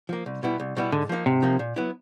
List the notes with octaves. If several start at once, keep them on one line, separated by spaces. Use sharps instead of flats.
F3 A#3
C2
B2 G3 B3 E4
C2
B2 G3 B3 E4
G#2 D3
F3 A#3 D#4
G#2 C3
F3 A#3 D#4
A#2
F#3 B3 E4